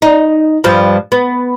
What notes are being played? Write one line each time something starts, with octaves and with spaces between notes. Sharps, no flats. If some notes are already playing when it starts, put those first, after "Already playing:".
D#4
G2 F3
B3